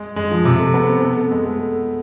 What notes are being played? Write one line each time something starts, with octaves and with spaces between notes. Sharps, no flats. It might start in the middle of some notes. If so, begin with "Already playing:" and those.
Already playing: G#3
G#3
F3
C3
A3
B3
C4
B3
A3
G#3
A3